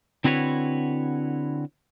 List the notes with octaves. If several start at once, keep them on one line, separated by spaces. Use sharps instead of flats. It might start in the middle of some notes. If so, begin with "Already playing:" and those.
D3 C4 E4 F#4 B4 C#5